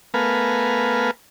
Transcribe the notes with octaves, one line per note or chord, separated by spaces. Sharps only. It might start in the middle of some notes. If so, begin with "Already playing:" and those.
A3 B3 A#4 B4 F5 G#5